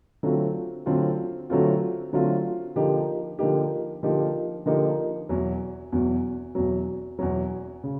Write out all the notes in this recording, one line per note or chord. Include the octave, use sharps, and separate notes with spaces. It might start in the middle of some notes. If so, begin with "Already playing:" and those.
D3 F#3 A3 C4 F4
D3 F#3 A3 C4 F4
D3 F#3 A3 C4 F4
D3 F#3 A3 C4 F4
D3 F3 A#3 D#4 G4
D3 F3 A#3 D#4 G4
D3 F3 A#3 D#4 G4
D3 F3 A#3 D#4 G4
E2 B2 F#3
E2 B2 F#3
E2 B2 F#3
E2 B2 F#3
C#3